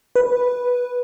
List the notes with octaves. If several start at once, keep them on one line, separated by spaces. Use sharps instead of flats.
B4